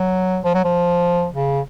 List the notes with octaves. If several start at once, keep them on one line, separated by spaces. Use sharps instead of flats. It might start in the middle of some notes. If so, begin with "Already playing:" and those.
Already playing: F#3
F3
F#3
F3
C#3